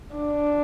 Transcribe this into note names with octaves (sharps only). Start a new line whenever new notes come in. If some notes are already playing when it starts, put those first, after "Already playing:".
D4